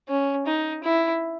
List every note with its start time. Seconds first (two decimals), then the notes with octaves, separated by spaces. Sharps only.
0.09 C#4
0.46 D#4
0.84 E4